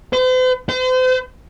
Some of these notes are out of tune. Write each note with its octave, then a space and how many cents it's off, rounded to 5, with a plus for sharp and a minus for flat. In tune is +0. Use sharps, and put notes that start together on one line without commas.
C5 -45
C5 -40